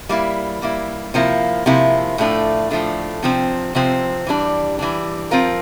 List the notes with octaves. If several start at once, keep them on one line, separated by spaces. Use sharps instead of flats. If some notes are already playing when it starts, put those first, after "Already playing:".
G3 A#3 E4
G3 A#3 E4
C3 F3 A#3 E4
C3 F3 A#3 E4
A2 F3 A3 D4
A2 F3 A3 D4
C3 F3 C4
C3 F3 C4
E3 G3 D4
E3 G3 D4
F3 C4 F4 A#4